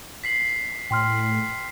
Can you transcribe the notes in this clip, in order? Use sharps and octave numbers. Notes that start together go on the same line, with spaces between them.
B6 C7 F#7
A2 G5 C6 F6
C7